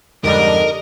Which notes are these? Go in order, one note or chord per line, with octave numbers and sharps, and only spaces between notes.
F2 G#2 D3 G3 D4 A#4 D#5